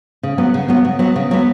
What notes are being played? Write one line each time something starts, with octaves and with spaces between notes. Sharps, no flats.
C#3
F#3 B3
C#3
F#3 B3
C#3
F#3 B3
C#3
F#3 B3